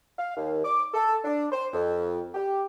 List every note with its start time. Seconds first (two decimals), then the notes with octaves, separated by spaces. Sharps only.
0.18 F5
0.36 D#2
0.65 D6
0.94 A4
1.25 D4
1.52 C5
1.73 F2
2.34 G4